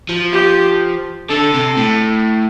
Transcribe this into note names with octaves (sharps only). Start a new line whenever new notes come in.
F3
G4
D3 A4
C3
A2